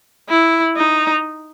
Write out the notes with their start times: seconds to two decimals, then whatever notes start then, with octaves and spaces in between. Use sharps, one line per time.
0.29 E4
0.77 D#4